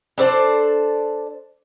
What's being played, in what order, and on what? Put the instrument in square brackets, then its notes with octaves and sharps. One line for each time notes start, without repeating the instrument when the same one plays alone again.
[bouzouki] D4 A4 C5 D5